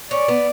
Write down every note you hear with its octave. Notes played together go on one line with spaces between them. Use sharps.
C#4 D5
B3